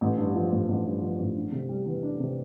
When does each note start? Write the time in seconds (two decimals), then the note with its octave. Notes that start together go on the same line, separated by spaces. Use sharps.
0.01 A1
0.17 G2
0.35 F3
0.52 A1
0.69 A1
0.85 G2
1.01 F3
1.19 A1
1.36 D4
1.52 C3
1.69 G3
1.86 E2
2.03 D4
2.20 C3